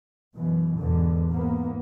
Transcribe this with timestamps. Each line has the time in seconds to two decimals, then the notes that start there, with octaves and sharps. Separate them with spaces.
0.36 F#2 B2 E3
0.80 E2 G#2 B2 D3
1.29 G#2 A#3 B3